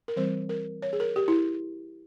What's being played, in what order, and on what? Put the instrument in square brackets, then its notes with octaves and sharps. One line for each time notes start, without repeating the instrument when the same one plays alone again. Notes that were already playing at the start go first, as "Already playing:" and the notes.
[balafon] A#4
E3 G3 C4 C5
A#4
C#5
G#4
A#4
G4
E4